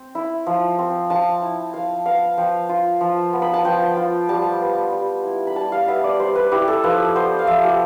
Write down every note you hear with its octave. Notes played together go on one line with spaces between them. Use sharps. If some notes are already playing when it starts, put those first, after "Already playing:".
Already playing: C4
E4
F3
C4
F3 A5
E4
F3 F5
B3 F5
F3 G5
F4
F3
B3
B5
A5
F3 G5
F4
G3 A5
B3
G3
E4
B5
G3 A5
F5
B3 E5
D5
G3 C5
B4
E4 G4
A4
F3 B4
B3 C5
F5
F3 E5
G4